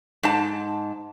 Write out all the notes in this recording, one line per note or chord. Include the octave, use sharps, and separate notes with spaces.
G#2 A5